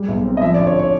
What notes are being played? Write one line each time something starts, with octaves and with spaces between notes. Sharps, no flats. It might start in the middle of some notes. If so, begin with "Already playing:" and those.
Already playing: G3 G#3
B1
C4
D#5
F3 E5
D5
D2
C#5
C#5